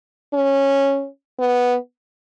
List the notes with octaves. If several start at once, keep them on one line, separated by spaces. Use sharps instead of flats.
C#4
B3